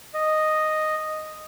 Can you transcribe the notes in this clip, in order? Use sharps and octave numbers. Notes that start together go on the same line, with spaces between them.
D#5